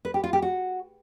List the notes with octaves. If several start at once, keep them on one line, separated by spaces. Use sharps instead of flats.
B4
G4
F4
G4
F#4